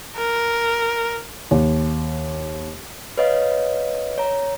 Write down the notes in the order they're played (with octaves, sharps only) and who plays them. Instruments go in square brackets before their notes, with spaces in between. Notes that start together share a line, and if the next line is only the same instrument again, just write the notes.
[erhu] A#4
[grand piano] D#2
[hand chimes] B4 C#5 D#5 F5
C#5 A#5